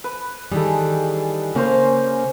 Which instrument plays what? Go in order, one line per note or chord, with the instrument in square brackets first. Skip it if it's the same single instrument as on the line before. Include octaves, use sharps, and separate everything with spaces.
[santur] B4
[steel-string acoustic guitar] D#3 E3 G3 [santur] G#4 A4
[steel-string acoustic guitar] C#3 A#3 [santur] C#4 C5 G#5